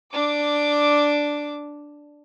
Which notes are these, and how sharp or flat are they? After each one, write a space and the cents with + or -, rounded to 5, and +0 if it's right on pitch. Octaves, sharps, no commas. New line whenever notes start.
D4 +0 D6 +0